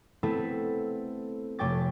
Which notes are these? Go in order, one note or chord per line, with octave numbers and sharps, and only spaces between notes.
A3 B3 C4 E4 A4
F1 A3 C#5 G5 D6 A6